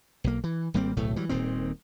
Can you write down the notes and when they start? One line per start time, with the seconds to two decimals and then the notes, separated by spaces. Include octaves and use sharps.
0.24 B1 A#3
0.44 E3
0.74 G#1 G3 A#3 C4
0.97 D1 B1 A2 A3
1.16 E3 F#3 G3
1.29 D#1 A#2 D#3 C4